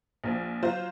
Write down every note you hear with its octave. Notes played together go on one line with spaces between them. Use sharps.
A#1 F3
F#3 F4 C5